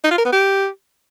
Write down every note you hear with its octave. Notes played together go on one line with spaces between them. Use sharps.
D#4
F4
A#4
B3
G4